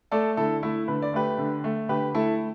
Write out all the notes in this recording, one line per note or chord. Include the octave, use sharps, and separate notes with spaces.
A3 A4 D5
D3 E4 A4
A3 E4
D3 B4
D5
A3 G4 B4
D3
A3
D3 G4 B4
A3 E4 A4